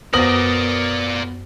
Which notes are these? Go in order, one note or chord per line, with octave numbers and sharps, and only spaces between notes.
F#2 B3 A#4 C5 D5 D#6 A#6 F#7